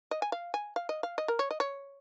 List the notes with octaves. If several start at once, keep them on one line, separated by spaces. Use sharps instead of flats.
D#5
G#5
F5
G#5
F5
D#5
F5
D#5
A#4
C#5
D#5
C#5